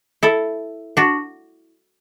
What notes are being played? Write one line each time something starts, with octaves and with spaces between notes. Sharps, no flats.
E4 A4
D4 F#4